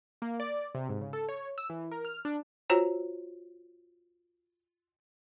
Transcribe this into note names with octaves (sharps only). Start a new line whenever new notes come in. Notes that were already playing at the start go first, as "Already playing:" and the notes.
A#3
D5
C3
G#2
C#3
A4
C#5
E6
E3
A#4
F6
D4
F4 F#4 C5 C#5 A#5